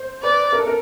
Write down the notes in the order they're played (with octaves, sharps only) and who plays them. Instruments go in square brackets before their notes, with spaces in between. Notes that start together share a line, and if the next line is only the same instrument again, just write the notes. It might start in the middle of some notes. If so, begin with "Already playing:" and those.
Already playing: [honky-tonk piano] C5
[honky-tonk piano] B4 [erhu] D5
[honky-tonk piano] A#4
A4
A#4